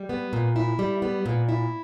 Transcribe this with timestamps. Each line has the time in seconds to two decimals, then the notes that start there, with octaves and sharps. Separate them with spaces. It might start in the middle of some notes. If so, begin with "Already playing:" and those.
Already playing: G3
0.09 B3
0.33 A#2
0.56 E4
0.79 G3
1.02 B3
1.26 A#2
1.49 E4